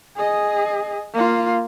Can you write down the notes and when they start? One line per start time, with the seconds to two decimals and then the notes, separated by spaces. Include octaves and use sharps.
0.17 G#4 D#5
1.14 A#3 F4